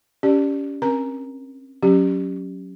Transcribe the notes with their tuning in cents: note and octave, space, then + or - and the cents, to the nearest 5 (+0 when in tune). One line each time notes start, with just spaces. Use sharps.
C#4 +25 G4 +0 D5 +10
C4 +35 A#4 +25 A#5 +0
F#3 +0 C#4 +0 G4 +0